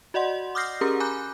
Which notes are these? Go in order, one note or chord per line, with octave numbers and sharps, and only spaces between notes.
F#4 D5 D#5 F#5 C6
D6 D#6 F6 G6 A#6 C7
C#4 G4 G#4 A#4 A#5
G#5 A#5 B5 D6 F#6 G6